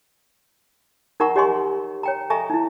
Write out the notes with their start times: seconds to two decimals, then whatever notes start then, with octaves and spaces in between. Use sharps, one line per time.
1.20 D#4 A#4 E5 F#5 A#5 C#6
1.36 G4 C#5 D#5 G#5 C6 C#6
2.03 C#5 G5 A#5
2.30 A4 D#5 E5 G#5 A#5 C#6
2.50 D#4 E4